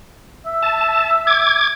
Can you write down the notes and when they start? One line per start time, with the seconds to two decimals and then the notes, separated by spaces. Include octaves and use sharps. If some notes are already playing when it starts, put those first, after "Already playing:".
0.46 E5
0.63 A5
1.27 D6 G#6